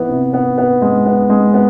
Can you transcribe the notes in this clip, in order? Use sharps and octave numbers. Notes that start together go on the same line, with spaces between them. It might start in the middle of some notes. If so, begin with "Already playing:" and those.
Already playing: E3 B3
C3
B3
B3
G#3
B3
G#3
B3